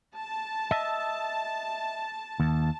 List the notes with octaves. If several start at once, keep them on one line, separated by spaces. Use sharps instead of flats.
A5
D#5 E5
D#2